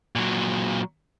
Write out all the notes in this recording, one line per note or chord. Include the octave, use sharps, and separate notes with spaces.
A#2 F#3